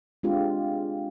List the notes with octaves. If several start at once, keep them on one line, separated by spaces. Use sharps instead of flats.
G#3 C4 D4 F4 G4